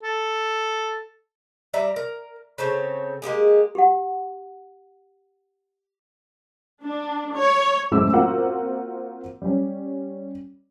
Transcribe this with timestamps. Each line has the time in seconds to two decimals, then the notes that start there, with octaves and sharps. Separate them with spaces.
0.03 A4
1.74 G3 D5 E5 A#5
1.96 A#4
2.58 C#3 C4 A4 C#5
3.22 G#3 A#3 G4 G#4
3.75 G4 F#5
6.83 D4
7.35 C#5
7.91 F#1 A2 G#3 E4 D6 E6
8.13 A#3 C4 F4 F#4 A#4 F#5
9.42 G3 C#4